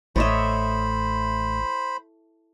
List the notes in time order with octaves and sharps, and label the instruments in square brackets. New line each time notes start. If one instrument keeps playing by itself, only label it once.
[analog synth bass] A1 [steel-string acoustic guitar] A2 [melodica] C5 B5 [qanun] C#5 D#5 E5